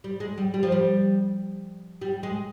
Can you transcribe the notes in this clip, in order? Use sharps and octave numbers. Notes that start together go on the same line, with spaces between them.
G3
G#3
G3
G3
F3
G3
G3
G#3